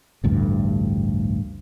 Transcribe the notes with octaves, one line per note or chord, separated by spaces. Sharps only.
A1 D2 G2